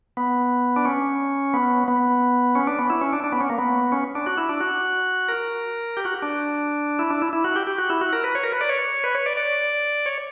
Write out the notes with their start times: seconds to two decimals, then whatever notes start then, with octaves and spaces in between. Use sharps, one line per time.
0.17 B3
0.76 D4
0.85 C#4
1.54 B3
1.88 B3
2.55 C#4
2.67 D4
2.79 B3
2.90 E4
3.01 C#4
3.13 D4
3.24 D4
3.32 B3
3.40 C#4
3.50 A#3
3.58 B3
3.92 C#4
4.15 D4
4.26 F#4
4.38 E4
4.49 D4
4.61 F#4
5.29 A#4
5.97 G4
6.05 F#4
6.22 D4
6.99 E4
7.10 D4
7.22 E4
7.33 E4
7.44 F#4
7.56 G4
7.67 G4
7.78 F#4
7.90 E4
8.01 F#4
8.13 A#4
8.24 B4
8.35 C#5
8.44 A#4
8.52 B4
8.61 D5
8.69 C#5
9.04 B4
9.15 C#5
9.26 D5
9.37 D5
10.06 C#5